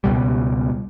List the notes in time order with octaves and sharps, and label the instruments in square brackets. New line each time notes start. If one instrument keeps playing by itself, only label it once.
[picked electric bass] C#2 B2 G3